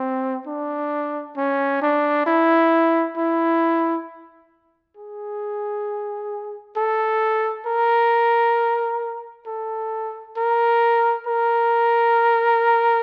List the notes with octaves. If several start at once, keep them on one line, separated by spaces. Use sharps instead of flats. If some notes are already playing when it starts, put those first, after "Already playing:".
Already playing: C4
D4
C#4
D4
E4
E4
G#4
A4
A#4
A4
A#4
A#4